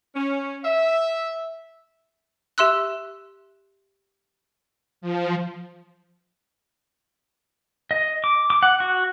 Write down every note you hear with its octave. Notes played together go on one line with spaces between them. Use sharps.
C#4
E5
G4 E5 C6 E6 F#6
F3
D#5
D6
D6
F#5
F#4